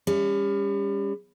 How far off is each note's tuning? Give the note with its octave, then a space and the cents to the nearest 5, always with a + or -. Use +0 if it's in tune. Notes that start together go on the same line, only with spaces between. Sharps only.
G3 +35 C#4 +15